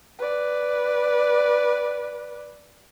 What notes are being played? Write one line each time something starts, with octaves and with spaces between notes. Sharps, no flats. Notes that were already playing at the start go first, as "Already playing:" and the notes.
B4 D5